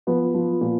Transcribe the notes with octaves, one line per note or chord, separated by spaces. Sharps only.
F3 B3
F3
A#2